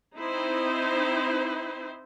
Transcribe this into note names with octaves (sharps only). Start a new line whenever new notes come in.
C4 D#4 E4 C5